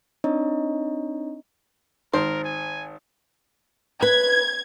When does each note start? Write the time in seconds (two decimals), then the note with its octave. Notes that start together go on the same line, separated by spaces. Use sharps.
0.24 C4 D4 D#4 C#5 D#5 A#5
2.13 G#1 A#4 C5
2.44 G#5
4.02 B4 G#6